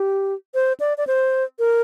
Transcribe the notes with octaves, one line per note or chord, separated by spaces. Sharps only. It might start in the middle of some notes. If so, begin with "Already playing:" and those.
Already playing: G4
C5
D5
D5
C5
A#4